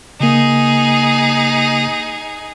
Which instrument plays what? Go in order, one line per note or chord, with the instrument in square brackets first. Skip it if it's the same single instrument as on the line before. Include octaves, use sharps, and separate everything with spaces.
[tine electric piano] C#3 A#3 [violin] D#4 G#4